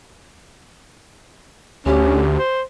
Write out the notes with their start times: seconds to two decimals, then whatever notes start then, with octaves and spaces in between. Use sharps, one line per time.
1.86 D2 C#4 G4
2.38 C5